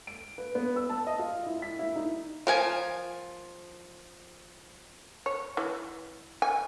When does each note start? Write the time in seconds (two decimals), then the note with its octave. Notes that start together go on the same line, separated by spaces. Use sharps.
0.07 D7
0.38 B4
0.55 B3
0.76 E6
0.90 A5
1.07 D#5
1.19 F4
1.46 E4
1.62 B6
1.79 E4
1.96 D#4
2.47 F3 A#4 G#5
5.26 C#5
5.57 E3
6.42 G#5